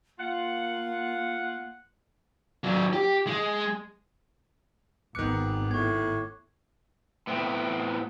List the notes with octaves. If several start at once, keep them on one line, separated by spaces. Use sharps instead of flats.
A#3 F4 F#5
F#3 D4
G4
G#3
G#1 D#3 B3 D6 F#6 C#7
A2 C#6 G#6
A2 B3 C4